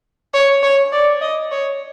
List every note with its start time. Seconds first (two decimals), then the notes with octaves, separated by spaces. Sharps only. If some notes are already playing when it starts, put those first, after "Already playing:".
0.34 C#5
0.63 C#5
0.92 D5
1.21 D#5
1.51 C#5